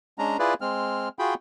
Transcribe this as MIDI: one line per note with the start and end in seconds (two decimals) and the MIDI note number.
0.19 0.37 56
0.19 0.37 61
0.19 0.37 62
0.19 0.37 82
0.39 0.54 64
0.39 0.54 65
0.39 0.54 68
0.39 0.54 71
0.39 0.54 74
0.61 1.09 56
0.61 1.09 60
0.61 1.09 89
1.19 1.34 65
1.19 1.34 66
1.19 1.34 68
1.19 1.34 79
1.19 1.34 83